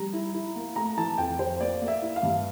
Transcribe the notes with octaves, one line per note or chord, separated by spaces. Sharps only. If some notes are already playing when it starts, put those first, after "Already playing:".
Already playing: G3 A#5
E4
E4
A#3
A3 A#5
E3 A5
F2 G5
F2 C5
A#3 D5
A#3
E5
E4
F5
G2